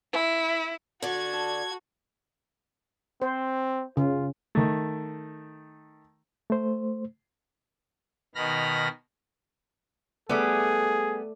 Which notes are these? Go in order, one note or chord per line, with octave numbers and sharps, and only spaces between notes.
E4
D3 F#4 D5 G#6
A4
C4 C5
C#3 F4
D#3 A3
A3 C5
B2 D#3 B5 F6 A#6
G3 A3 B3 G#4 D5 E5